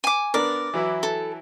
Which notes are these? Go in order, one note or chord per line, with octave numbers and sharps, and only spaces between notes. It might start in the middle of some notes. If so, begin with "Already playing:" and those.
G#5 D6
B3 D4 A#4 D5
E3 F#3 E4
A4